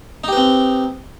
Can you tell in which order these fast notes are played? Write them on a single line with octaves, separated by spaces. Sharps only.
D#4 G4 B4 C4